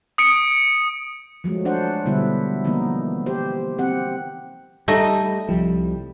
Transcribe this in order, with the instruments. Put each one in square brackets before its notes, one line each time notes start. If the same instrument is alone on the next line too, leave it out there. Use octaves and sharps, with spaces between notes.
[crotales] D#6 C#7 D7
[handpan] F3 F#3 G#3 A3
D4 C5 D5 F#5
B2 D3 G3 B3 E4
E3 F3 A#3 B3 D#4
G4 C5
C4 G4 F#5
[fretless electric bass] G3 [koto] A3 D#4 D#5
[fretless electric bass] C2 G3 [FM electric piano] F3